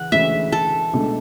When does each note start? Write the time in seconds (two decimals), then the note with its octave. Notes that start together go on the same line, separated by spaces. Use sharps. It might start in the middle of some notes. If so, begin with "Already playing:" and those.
Already playing: C#3 E3 C#4 F#5
0.12 D2 C#3 E3 G#3 C#4 E5
0.52 A4
0.93 C#2 B2 A3 D4